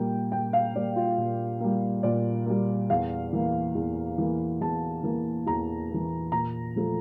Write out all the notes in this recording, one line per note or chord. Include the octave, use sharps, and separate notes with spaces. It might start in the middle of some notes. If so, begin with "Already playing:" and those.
Already playing: A#2 G3 A#3 G5
A#2 G5
F5
G3 A#3 D5
F4
A#2
G3 A#3
A#2 D5
G3 A#3
E2 F5
E3 A#3
E2
E3 A#3
E2 A5
E3 A#3
E2 A#5
E3 A#3
A#2 A#5
F3 A3